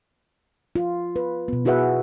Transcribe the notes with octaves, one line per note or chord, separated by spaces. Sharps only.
F4
B4
B2 B3
E4 F#4 G#4 B4 E5 F#5